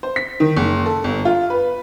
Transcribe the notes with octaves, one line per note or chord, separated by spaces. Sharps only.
C5
B6
D#3
F#1
A4
G1
F4
B4